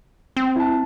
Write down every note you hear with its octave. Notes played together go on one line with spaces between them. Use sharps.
C4
E4 A5